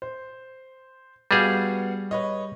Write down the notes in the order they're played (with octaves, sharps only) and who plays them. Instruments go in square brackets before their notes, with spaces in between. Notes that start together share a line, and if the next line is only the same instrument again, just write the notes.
[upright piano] C5
[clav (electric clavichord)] G3 G#4 [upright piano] B3 F#4 F5
[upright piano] B4 C#5 D#5